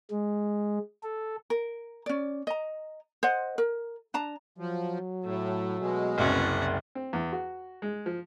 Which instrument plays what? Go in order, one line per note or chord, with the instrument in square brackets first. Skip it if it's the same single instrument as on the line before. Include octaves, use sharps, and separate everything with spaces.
[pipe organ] G#3
A4
[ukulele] A#4
C#4 D5
D#5 A#5
C5 D#5 F#5
A#4
D4 A5 A#5
[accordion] F3 [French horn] F#3
[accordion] A2 [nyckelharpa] A3
[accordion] B2 G#3
[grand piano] F#1 C2 [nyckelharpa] C#4 F#5
[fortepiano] C4
E2
F#4
G#3
F3